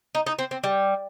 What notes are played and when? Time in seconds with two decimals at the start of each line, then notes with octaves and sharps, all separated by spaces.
0.15 D#4
0.27 D#4
0.39 C4
0.51 C4
0.64 G3